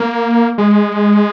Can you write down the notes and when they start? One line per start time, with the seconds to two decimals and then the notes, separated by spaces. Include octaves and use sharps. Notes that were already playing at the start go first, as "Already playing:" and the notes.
Already playing: A#3
0.58 G#3